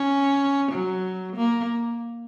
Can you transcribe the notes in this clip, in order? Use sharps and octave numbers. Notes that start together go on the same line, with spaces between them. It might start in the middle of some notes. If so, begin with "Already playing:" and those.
Already playing: C#4
F#3
A#3